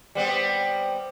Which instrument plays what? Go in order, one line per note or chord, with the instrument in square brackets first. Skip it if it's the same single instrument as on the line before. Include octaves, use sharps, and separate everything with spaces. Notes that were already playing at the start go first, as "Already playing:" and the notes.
[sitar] G3 B3 C4